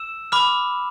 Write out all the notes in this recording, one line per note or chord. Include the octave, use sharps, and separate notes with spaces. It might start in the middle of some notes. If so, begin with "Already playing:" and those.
Already playing: E6 E7
B5 D6 F6